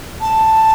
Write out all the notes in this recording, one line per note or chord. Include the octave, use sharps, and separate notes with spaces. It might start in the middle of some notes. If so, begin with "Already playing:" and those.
A5